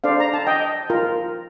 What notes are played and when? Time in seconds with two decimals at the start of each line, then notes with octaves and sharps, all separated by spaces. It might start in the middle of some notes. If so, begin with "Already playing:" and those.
0.04 D4 A4 C5 D5 F5
0.20 A#5
0.34 A5
0.47 D#5 G5
0.90 F4 A#4